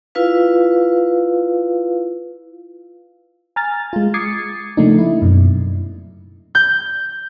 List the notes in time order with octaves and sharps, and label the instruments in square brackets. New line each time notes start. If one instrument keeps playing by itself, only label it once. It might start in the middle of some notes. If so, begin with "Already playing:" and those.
[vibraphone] E4 F4 B4 F5
[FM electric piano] G#5 A#5 F6 A6
G#3 F4
D6 D#6 G#6 A6 C7 C#7
C#3 F3 A3 A#3 D4 D#4
E4
F#2 B2
[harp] G6